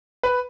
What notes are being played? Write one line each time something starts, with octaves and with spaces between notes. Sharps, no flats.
B4